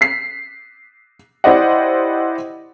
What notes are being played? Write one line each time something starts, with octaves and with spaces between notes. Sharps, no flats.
B6 C7
E4 G4 C5 D5 D#5 F#5